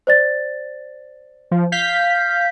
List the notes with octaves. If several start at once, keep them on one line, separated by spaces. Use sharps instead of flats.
C5 D5 A6
F3
F5 G6 B6